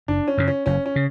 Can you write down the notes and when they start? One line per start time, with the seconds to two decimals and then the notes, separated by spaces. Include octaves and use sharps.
0.08 F#1 D4
0.28 C#4
0.38 F#2 C#3
0.48 C#4
0.66 F#1 C#4
0.86 C#4
0.96 C#3